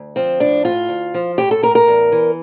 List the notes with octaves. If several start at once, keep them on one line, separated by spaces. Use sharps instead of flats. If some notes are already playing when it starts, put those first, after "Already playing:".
Already playing: D2
F3 C4
A2 D4
A2 F4
D2
F3
A2 G4
A4
A2 A#4
A#4
E2
E3